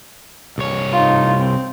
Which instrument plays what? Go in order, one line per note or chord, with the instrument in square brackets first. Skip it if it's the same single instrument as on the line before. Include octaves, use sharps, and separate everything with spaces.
[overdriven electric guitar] C2 C#5
[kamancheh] D#4 F4
C4